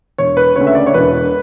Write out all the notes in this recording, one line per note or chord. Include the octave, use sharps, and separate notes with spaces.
E1 C#5
B4
D2 C#3 C#5
E5
D5
C#5
E1 B4